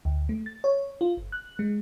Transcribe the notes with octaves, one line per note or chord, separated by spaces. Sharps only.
D2
A3
A6
C#5
F4
G1
F#6
G#3